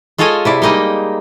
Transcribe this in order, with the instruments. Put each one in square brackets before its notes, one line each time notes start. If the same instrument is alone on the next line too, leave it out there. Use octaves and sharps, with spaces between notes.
[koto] G#3 F4 A4 C#5 D#5 G#5
C3 E4 D5
G3 G#3 A#3 D#4 D#5